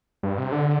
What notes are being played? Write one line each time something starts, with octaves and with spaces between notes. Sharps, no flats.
G2
C3
D3